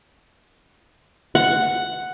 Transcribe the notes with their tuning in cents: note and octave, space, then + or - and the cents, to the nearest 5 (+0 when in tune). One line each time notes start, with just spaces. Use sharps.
F#5 +0